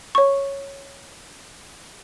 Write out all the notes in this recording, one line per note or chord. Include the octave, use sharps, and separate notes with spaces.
C#5 C#6